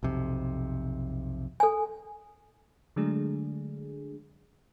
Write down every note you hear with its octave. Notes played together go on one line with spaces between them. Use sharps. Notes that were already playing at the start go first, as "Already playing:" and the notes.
B1 F2 C3
A4 G#5
D3 F#3 G#3 A3 D4 G#4